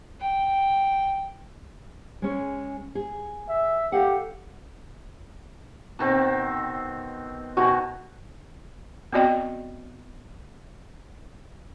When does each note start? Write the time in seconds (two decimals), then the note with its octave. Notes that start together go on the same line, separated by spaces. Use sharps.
0.21 G5
2.22 G#3 C#4
2.95 G#4
3.49 E5
3.92 G4 A4 F5 F#5
5.99 B2 D#3 C4
7.57 B2 D#3 F#4 G#5
9.13 B3 C4 F#4 D5 D#5 G5